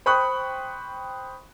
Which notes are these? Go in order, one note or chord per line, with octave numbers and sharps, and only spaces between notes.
C5 G5 B5 C#6 D#6 F#6